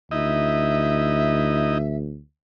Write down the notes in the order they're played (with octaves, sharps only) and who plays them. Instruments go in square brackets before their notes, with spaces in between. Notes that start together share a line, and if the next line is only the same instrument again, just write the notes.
[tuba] D2 [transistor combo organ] D#4 E4 D#5 [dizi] E5